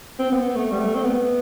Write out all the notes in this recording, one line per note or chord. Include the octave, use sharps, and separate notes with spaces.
C4
B3
B3
A3
G3
A3
C4
B3